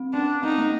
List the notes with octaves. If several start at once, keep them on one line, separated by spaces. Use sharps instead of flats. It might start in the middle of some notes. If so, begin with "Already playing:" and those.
Already playing: C4
C#4 D4
C4 D#4
A#3